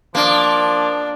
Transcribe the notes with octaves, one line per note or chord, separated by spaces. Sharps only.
F3 A#3 D4